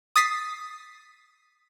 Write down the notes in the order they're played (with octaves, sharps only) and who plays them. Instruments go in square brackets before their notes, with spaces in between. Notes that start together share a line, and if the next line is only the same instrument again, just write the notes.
[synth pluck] D#6 A6 B6 C7